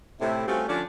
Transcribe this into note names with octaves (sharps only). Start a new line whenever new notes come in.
A2 C3 E4
G3 A3 C4 C#4 F4 F#4
D3 F3 C#4 D4